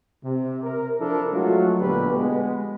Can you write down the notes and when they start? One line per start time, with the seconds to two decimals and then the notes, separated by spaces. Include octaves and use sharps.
0.24 C3
0.62 A#4
0.99 F3 D4 E4 A4 A#4
1.32 F#3 G#3 A3 F4 F#4
1.79 A#1 B2 D3 G4 B4
2.14 G#3 B3